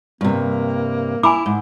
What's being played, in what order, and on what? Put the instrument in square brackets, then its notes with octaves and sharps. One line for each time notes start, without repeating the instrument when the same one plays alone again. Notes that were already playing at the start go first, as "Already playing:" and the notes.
[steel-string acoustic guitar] G2 C3 [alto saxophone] A#3
[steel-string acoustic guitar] E4 [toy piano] G#5 B5 D6
[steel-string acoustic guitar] G#2